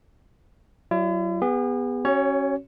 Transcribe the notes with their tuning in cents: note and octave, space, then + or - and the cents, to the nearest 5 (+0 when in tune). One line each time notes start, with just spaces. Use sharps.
F#3 +15 E4 +45 D5 +20
B3 +0 G#4 -40
C#4 -20 F#4 +20 C#5 +15